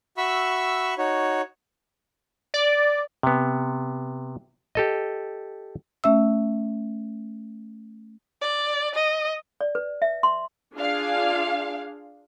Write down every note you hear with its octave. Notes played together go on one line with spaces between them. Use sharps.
F#4 E5 B5 C#6 E6
D#4 F#4 C#5
D5
C3 B3
G4 A4 D#5
A3 C#4 E5 E6
D5
D#5
D5
B4
E5
C6
D4 F4 G#4 F5